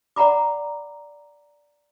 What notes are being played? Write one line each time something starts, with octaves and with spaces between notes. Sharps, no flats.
D5 F#5 A#5 B5 D6